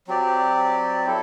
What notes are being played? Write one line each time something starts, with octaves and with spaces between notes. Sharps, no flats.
F#3 C4 G4 D5
C4 E4 A4